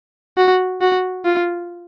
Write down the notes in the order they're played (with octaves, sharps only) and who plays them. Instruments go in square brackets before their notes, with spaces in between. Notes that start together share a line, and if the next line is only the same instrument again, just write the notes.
[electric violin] F#4
F#4
F4